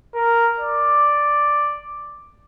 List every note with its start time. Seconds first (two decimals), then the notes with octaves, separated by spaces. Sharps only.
0.15 A#4
0.60 D5